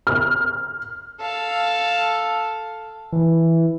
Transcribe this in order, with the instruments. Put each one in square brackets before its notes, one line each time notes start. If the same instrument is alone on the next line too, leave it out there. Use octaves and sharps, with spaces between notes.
[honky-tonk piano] F6
[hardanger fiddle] A4 F5
[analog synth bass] E3